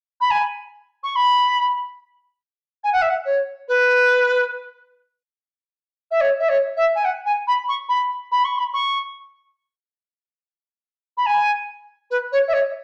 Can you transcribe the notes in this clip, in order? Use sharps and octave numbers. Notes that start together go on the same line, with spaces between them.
B5
G#5
C#6
B5
G#5
F#5
E5
F#5
C#5
B4
E5
C#5
E5
C#5
E5
G#5
F#5
G#5
B5
C#6
B5
B5
C#6
B5
C#6
B5
G#5
B4
C#5
E5
C#5